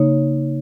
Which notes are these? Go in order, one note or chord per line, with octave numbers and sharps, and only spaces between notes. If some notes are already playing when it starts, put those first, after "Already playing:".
Already playing: C#3 A#3 D#4 C#5